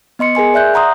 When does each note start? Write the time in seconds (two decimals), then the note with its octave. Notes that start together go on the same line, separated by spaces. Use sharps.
0.19 B3 D#5 C6 C#7
0.35 G#4 A#4 G#5 C6
0.54 D5 E5 F#6 G6
0.74 F#5 A#5 C6 D#6